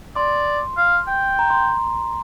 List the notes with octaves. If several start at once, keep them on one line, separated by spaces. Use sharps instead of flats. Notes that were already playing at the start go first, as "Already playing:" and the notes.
D5 C6
F5
G5
A#5
C6